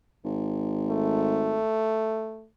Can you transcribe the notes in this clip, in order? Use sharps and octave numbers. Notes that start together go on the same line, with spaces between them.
G#1
A3